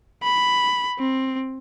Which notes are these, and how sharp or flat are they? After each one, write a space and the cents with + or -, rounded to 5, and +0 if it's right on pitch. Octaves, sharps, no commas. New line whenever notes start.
B5 +5
C4 +10